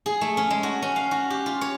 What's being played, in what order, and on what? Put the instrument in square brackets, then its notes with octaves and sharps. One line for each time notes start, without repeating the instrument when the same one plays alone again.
[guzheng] G#4
A3
C#4
G#3
F#4
C#4
F5
F#4
G4
F4
C#5